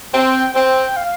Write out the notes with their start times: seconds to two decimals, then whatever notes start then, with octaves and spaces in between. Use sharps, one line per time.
0.14 C4 G5
0.55 C4 G5
0.96 F5